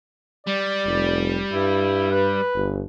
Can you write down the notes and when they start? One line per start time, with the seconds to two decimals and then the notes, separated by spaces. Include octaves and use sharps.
0.47 G3 D5
0.86 F1
1.53 G2 E4
2.11 B4
2.55 G1